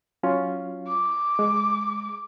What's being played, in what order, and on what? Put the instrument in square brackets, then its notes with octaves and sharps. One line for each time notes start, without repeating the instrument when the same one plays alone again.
[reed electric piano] F#3 C#4 F4
[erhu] D6
[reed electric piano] G#3